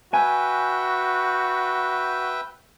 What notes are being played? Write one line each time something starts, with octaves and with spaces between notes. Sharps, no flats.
F#4 B4 E5 G5 G#5